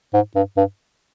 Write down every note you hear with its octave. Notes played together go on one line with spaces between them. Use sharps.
G#2
G2
G2